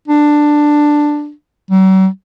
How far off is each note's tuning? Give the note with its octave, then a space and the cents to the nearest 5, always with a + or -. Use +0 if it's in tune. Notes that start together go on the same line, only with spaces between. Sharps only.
D4 +10
F#3 +45